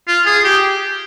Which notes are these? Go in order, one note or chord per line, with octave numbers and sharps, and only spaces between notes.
F4
G#4
G4